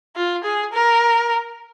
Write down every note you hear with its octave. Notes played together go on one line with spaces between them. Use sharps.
F4
G#4
A#4